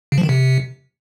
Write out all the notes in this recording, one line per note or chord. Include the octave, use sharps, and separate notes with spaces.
C#3
F3
D#3
C3